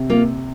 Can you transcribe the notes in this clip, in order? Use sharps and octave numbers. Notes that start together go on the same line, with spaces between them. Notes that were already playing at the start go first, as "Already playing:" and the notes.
Already playing: C3
A#3 F4